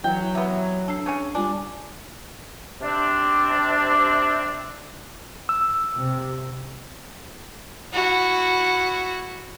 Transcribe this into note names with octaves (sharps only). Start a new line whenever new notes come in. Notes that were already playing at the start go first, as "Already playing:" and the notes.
E3 F#3 G5
C3 B3 E5
D4 A4 C7
C#3 C#5 G#5
G3 D4 F4 G#5
C3 C4 D4
E6
C3
E4 F#4